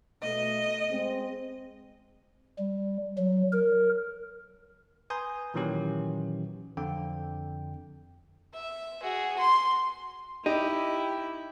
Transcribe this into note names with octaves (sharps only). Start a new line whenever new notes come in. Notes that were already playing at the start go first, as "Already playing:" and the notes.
B2 A3 D#5
G#3 C4
G3
F#3
A#4
B4 G#5 A#5 C6 D#6 G6
A#2 D#3 E3 F#3 C#4 G4
F2 D3 G5
E5
F#4 G#4
C6
D#4 E4 G4 D#5